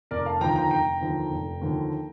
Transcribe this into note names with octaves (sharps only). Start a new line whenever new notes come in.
F1 A#4 D5
F5 A5
D#2 D3 F3 G5 A#5
G5 A#5
F1 G5 A#5
D#2 D3 F3
F1
D#2 D3 F3